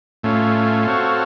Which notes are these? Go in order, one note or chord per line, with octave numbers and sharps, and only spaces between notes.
A2 A3 C#4 F4
C4 F#4 A4 C#5 F5